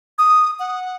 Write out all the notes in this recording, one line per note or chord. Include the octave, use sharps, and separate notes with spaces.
D#6
F#5